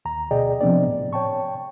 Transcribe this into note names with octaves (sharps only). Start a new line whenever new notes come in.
D#2 A#5
D2 B2 G#4 D5 D#5 G5
C3 F3 B3 C4 D4 D5
A2
C#5 G5 A5 C#6